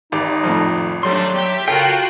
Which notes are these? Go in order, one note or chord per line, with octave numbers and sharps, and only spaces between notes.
G#1 D#4 G4
F2 A2 F3
F#3 G3 A3 D4 C6
G4 E5 G5
C#3 F4 F#4 A4 A#4 G5